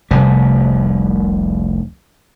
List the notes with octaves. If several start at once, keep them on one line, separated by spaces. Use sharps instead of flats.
F1 C2 G3